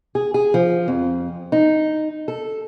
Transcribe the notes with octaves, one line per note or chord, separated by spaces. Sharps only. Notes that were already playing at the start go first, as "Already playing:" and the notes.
G#4
G#4
F3
F2
D#4
A4